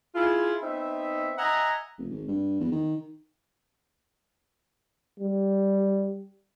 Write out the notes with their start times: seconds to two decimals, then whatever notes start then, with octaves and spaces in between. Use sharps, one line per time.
0.15 E4 F4 G#4
0.62 B3 C4 D#4 E5
1.38 D#5 E5 F#5 G#5 A#5
1.98 F1
2.11 G#1
2.28 G2
2.60 E2
2.72 D#3
5.20 G3